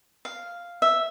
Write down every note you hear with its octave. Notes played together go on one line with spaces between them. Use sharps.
F5
E5